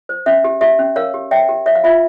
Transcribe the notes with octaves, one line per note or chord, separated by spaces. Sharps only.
C5
C#4 E5
G4
G4 E5
C#4
A#4 C#5 F5
G4
C#5 E5 G5
G4
C#5 E5
F5
F4 E5